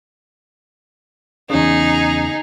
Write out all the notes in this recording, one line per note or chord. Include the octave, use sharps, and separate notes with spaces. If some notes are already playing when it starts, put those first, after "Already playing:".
E2 C#3 D#4 G#4 D#6